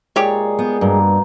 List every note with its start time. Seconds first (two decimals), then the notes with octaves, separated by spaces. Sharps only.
0.16 A#2 G#3 G4 G#4 C#5 D5
0.59 B3 G5
0.81 G2 B2 A#3